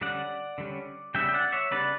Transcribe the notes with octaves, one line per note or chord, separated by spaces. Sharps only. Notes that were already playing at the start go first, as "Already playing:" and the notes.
D3 G3 C#4 D5 F#5
D3 G3 C#4
C#3 G3 B3 D4 E5 G5
G5
D5 F#5
C#5 E5
C#3 G3 B3 D4 B4 D5